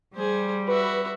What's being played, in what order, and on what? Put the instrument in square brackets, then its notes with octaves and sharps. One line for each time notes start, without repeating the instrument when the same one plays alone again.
[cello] G3 [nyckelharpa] G#4 C5
[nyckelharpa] F#4 E5 [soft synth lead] B4